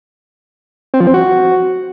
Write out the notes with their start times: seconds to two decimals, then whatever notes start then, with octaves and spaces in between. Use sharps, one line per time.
0.94 C4
1.00 F3
1.07 C4
1.14 F#4